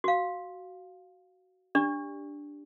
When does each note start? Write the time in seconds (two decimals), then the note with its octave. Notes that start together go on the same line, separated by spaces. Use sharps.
0.04 F#4 F5
1.75 D4 G4 D5